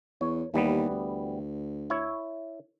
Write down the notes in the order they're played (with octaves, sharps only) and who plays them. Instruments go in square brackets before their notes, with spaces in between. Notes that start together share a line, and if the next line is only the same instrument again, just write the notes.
[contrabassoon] E2 [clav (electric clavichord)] C#5
[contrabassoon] D#2 [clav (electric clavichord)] E3 G3 B3
[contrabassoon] D2
[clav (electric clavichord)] E4 C#5